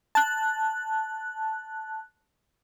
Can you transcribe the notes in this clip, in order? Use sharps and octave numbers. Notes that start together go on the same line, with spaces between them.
A5 F#6